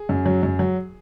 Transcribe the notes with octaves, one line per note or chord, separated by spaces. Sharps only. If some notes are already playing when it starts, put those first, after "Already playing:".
Already playing: G#4
F#2
F#3
F#2
F#3